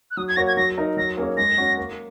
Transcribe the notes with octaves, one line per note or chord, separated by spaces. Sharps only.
F#6
F#3 D#6
G#6
A#3 F#4 C#5 A#6
G#6
F#3 A#6
D#4 A#4 D#5
F#3 A#6
A#3 C#4 G#4 C#5
G#3 A#6
C#4 F#4 C#5
A#3